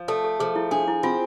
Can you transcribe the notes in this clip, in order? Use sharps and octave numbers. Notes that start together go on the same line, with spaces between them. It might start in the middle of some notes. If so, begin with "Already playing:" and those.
Already playing: F3
A3 A4
A4
F3 G#4
E4
D4 G#4
E4
C4 F4